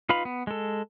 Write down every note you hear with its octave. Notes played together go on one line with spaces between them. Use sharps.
D#4 F4 B4 F5 B5
B3
G#3 A4